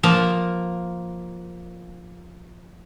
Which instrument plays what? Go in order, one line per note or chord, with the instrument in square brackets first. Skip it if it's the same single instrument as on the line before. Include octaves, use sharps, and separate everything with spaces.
[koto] F3 A#3 A#4